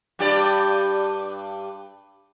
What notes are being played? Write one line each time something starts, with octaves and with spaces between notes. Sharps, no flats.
G2 G4 D5